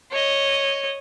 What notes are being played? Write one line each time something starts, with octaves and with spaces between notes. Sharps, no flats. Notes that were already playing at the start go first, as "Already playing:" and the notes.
C#5 D#5